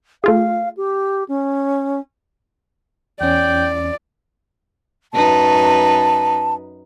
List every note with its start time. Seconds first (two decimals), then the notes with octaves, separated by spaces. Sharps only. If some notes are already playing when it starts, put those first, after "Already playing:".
0.24 A3 F4 G#4 F5
0.77 G4
1.28 C#4
3.21 E2 C#4 D5 G5
5.14 F#2 D#4 B4 A5